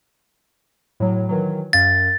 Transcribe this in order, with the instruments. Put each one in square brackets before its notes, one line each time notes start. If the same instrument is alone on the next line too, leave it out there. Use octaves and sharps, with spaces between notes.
[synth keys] A2 F#3
D#3 E3 F#3
[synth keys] F#2 F5 [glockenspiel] A6